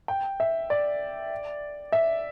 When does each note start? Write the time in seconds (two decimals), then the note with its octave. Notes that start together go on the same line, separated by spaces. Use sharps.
0.08 G5
0.40 E5
0.70 D5
1.92 E5